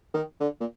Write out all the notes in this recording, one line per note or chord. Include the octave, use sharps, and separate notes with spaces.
D#3
D3
A#2